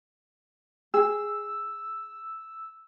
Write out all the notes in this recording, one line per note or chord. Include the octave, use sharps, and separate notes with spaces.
G#4 E6